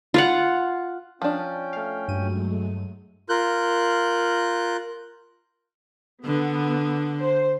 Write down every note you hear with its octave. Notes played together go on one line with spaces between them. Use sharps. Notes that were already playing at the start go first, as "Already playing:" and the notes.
F4 F5 F#5
F3 C#4 D4 G5
A3 F5
G2 F#3 G#3 A3 D#7
F4 A#4 F#6 G6
D3 B3
C5